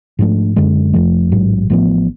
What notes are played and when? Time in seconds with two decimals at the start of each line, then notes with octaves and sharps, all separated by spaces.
0.19 G#2 F3 A3 D4
0.56 F#2 D3 G#3
0.93 F1 F2 F3 A3
1.32 A1 G#2 F#3
1.70 A1 A2 F3 B3